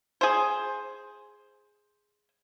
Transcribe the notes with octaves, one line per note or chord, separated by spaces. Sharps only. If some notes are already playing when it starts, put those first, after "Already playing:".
G#4 C5